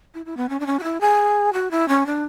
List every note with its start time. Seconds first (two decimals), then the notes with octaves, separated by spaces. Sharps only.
0.14 E4
0.26 E4
0.37 B3
0.49 C#4
0.60 D4
0.66 C#4
0.79 F#4
0.83 E4
1.01 G#4
1.53 F#4
1.71 E4
1.88 C#4
2.06 D4